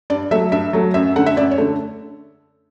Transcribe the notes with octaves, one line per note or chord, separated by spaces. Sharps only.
G2 D5
F#3 A3 E5
G2 E5
F#3 A3
F#2 E5
D3 A3 F#5
E5
F#2 D5
C#5
D3 A3